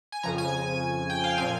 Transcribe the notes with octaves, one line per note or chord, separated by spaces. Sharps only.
G#5
F2 C#3 F3 A#5
G#5
G5
F5
A#2 F3 C4 G#5